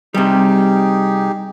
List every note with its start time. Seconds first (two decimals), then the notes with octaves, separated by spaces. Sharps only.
0.14 C3 G3 D#4 G4 G#4